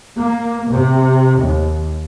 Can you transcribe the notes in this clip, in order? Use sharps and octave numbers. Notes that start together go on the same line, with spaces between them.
A#3
C3
D#2